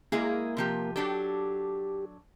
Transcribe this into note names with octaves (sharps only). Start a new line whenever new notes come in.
G#3 A#3 E4 G#4
C3 F3 G4
F#3 D4 G4 A4